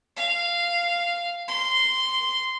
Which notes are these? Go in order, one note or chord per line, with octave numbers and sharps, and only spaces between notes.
F5
C6